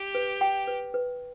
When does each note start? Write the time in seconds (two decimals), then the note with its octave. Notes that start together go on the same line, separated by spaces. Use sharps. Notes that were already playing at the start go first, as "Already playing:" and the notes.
Already playing: G4
0.15 B4
0.41 G5
0.67 B4
0.94 B4